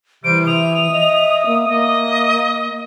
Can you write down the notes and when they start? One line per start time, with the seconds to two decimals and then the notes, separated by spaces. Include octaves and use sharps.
0.24 C3 E3 G3 C5 D7
0.47 E5 D#6 F7
0.92 D#5
1.47 A#3
1.68 A#3 D#5